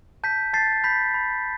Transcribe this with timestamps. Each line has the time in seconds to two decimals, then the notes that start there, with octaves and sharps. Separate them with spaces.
0.24 A5 G6 B6
0.53 A5 A6 C7
0.84 B5 G6 B6
1.14 B5